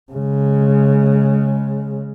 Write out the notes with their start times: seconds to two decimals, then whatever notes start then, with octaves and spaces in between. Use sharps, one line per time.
0.12 C#3 G#3